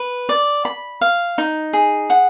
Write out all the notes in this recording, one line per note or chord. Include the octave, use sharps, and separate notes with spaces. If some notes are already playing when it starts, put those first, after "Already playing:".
Already playing: B4
D5
B5
F5
D#4
G#4
F#5